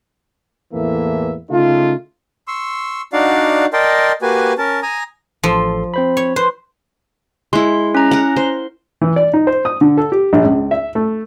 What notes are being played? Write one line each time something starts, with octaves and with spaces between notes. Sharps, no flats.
E2 A2 E3 A3 A#3 E5
C#3 A3 D#4 F4
C6 C#6 E6
D4 D#4 F#4 D5 F5 F#5
A#4 D5 D#5 G5 A5 C6
A#3 F#4 G4 B4 G#5
C#4 A#4 A5
G#5 A#5 D#6
A1 F3 A4 C6
C4 C5 B5
C#5
B4 C5
G#3 E4 C6
C#4 A#5
A#4 F#5
C5
E3
D5
D#4
C5
D#6
D3
A4
G4
A#1
C#2
E5
A3